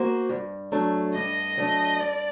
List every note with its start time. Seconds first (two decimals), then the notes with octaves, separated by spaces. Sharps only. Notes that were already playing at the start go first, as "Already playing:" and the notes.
Already playing: A#3 F#4 C5
0.29 G2
0.72 F#3 A3 D4
1.14 G2 D#5
1.57 F#3 A3 D4
2.00 G2 D5